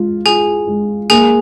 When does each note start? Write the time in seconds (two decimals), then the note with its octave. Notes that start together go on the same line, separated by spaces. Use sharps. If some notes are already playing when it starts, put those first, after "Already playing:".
Already playing: G#3 F4
0.26 F4 G#4 G#5
0.67 G#3
1.10 A#3 G#4 G#5